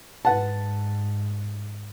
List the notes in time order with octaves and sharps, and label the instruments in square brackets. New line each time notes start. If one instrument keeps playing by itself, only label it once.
[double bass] G#2 [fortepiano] B4 F#5 A5